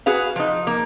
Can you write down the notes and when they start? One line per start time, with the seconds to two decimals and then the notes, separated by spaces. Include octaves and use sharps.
0.06 F#4 G#4 B4 F5
0.36 F3 D#4
0.67 A#3